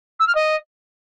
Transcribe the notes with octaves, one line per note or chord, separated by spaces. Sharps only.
E6
F6
D#5